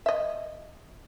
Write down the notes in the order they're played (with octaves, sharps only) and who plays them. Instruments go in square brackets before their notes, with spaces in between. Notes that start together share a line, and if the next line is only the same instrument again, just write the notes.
[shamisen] D#5 E5